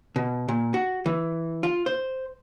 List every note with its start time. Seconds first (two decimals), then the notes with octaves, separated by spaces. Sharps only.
0.16 B2
0.48 A#2
0.74 F#4
1.06 E3
1.63 F4
1.86 C5